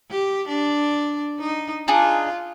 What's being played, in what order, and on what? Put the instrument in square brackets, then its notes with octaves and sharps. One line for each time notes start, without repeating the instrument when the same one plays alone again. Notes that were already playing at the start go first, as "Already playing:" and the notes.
[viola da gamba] G4
D4
D#4
[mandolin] D4 D#4 G#4 [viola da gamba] F4